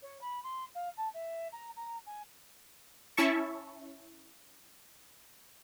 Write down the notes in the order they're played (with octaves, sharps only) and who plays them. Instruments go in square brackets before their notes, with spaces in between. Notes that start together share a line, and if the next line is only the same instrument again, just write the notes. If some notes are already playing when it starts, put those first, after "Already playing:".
[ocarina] C#5
B5
C6
F5
A5
E5
A#5
A#5
G#5
[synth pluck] C#4 E4 E5 A5 C#6